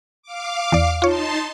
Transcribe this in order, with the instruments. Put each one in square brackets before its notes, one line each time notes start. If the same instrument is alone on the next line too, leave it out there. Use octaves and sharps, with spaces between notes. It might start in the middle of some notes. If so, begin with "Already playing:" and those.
[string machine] F5 D6
[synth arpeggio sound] E2 D5
[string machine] D#4 A5 C6 [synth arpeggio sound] F4 C#5